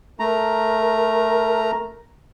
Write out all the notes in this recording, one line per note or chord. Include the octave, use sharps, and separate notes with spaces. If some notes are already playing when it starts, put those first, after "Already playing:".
A3 A#4 A#5